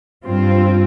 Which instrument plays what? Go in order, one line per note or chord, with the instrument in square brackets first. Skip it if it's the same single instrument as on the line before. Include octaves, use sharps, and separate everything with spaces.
[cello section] G2 C4 F4